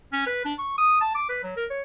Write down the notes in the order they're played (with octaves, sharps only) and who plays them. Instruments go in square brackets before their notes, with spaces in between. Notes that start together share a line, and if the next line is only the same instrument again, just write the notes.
[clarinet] C#4
B4
D4
C#6
D#6
A5
D6
B4
F#3
A#4
C#5